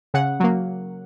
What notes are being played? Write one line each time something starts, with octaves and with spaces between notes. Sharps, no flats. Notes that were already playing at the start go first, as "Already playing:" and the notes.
C#3 F#5
F#3 A#3